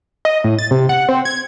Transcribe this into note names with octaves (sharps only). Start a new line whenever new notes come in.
D#5
A2
A6
C3
F#5
C4
G#6